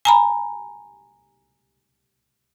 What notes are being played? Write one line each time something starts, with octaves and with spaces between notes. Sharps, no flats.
G#5 A#5 B5